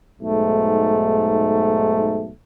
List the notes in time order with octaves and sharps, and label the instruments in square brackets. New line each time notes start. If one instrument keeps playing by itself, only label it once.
[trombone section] B1 G#2 A3